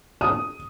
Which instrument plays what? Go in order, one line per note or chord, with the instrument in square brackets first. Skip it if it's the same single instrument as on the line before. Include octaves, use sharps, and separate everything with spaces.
[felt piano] D#6